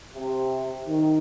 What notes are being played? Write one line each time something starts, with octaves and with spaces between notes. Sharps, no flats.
C3
D#3